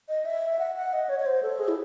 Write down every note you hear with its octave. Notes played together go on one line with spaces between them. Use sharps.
D#5
E5
F#5
F#5
D#5
C#5
C#5
C5
A4
G#4
E4